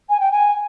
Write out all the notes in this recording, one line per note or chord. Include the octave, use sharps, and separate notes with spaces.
G#5
G5
G#5